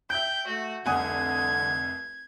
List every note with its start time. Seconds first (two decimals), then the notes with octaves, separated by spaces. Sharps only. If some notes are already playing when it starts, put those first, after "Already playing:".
0.10 E5 G5 G6
0.48 A3 F#4
0.86 F1 C2 D3 F#5 G#5 D#6 G#6